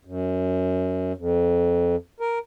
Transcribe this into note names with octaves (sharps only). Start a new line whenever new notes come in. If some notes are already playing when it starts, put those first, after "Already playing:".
F#2
F2
A#4